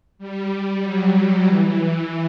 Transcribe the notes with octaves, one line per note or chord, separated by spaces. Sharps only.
G3
F#3
E3